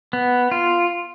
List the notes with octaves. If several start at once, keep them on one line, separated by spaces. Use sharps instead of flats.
B3
F4